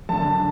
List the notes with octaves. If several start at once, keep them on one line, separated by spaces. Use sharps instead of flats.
F#2 D3 A5